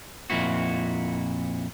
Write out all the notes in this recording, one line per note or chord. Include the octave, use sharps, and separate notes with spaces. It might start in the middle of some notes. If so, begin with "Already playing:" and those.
F2 A#2 E4 F#4